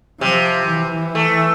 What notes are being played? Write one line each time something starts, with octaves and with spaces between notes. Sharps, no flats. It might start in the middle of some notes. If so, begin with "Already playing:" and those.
C3 F3
E3
A3